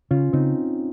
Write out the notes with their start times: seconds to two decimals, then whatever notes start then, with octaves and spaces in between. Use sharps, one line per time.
0.11 C#3 C#4 F4
0.33 C#3 C4 D#4